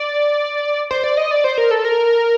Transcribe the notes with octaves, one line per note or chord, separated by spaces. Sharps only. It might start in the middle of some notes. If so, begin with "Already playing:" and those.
Already playing: D5
C5
D5
D#5
D5
C5
A#4
A4
A#4